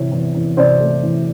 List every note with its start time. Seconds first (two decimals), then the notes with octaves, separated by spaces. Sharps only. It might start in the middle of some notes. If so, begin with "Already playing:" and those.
Already playing: C3 E3 C#5
0.12 E2
0.35 E2
0.57 C3 C5 D5
0.80 A3
1.03 E3